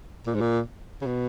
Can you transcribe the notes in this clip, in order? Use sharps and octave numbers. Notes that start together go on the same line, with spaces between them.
A#2
G#2
A#2
C#3
B2